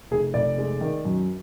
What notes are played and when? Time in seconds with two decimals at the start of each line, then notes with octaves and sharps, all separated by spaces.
0.11 F1 G#4
0.34 F1 D5
0.58 G#3
0.81 D#3
1.05 F#2